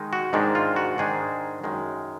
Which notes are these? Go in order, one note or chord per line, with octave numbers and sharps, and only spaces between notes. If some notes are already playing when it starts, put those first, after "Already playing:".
Already playing: D#3 G#3 D#4
F#4
G#2 D#3 G#3 D4
F4
F#4
G#2 D#3 G#3 D4 G#4
F#2 D#3 G#3